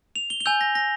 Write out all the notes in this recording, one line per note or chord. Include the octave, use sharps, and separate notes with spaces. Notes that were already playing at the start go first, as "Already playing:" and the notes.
F7
G7
G7
G#5 E6 G6 F7
A#6
A#6